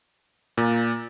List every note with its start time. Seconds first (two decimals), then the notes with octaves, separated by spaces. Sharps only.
0.58 A#2